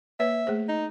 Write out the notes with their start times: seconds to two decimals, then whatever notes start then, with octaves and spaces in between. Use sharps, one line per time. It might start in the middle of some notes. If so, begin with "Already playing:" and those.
0.20 A#3 B4 C#5 E5
0.47 A3 G#4 C5
0.68 D#4